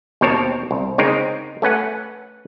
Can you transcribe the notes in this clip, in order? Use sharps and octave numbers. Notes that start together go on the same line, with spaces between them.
D#2 B2 C4 A#4 C#5 A5
C2
C#3 G#3 C4 D#4 A#4
A3 C#4 B4 F#5